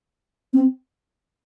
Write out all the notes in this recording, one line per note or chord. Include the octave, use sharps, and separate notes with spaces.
C4